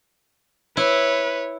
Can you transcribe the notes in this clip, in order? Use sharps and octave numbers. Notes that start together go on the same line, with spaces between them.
E4 B4 C#5